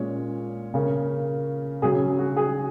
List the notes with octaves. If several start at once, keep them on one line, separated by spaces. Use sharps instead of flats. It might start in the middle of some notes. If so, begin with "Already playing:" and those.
Already playing: A#2 G#3 C#4 C#5
C#3 A#3 C#4
C#3 F#3 C#4 G#4
F#4
G#4